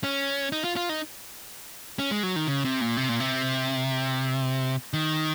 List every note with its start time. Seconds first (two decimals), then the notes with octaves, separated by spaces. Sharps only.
0.04 C#4
0.52 D#4
0.64 F4
0.76 F4
0.89 D#4
1.99 C#4
2.11 G#3
2.23 F#3
2.36 D#3
2.48 C#3
2.65 C3
2.81 A#2
2.97 C3
3.09 A#2
3.20 C3
4.93 D#3